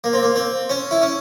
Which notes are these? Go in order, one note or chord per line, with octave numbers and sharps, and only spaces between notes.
A#3
C4
A#3
C4
C#4
E4
C#4